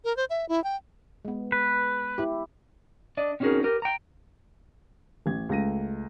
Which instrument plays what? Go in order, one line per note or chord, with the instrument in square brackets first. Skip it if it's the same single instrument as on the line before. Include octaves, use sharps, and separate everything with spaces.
[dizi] A#4
C5
E5
E4
G5
[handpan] G#3 B3
[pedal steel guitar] B4
[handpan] E4 G4
[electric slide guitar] D4 D5 D#5
C4 C#4 D#4 F#4 G#4 A#4
G4 A#4 B4
G5 A#5
[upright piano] A1 G#6
C#2 A3 A#6 D#7